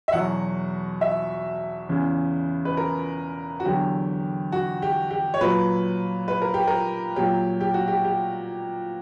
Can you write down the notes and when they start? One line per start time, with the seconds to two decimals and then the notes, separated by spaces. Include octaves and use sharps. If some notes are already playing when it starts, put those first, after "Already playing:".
0.08 E5
0.13 E2 B2 F#3 F#5
1.01 E5
1.89 E2 C#3 E3
2.65 B4
2.77 A#4
3.60 F#4
3.64 E2 D3 F#3 G4
4.52 F#4
4.82 G4
5.11 G4
5.34 C#5
5.41 A#2 F#3 B4
6.28 B4
6.42 A#4
6.54 G4
6.67 A#4
7.16 A#2 F#3 G4
7.61 G4
7.74 F#4
7.88 G4
8.04 G4